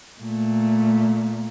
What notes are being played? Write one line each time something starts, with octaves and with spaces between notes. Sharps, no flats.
A#2 A3